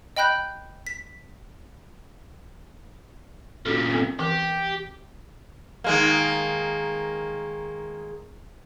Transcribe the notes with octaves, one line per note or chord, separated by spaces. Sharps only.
D#5 G5 B5 F#6 G6
B6
A#2 C#3 D4 F#4 A4
B3 C4 A4
E3 G4 A#4
D#3 G#3 A#3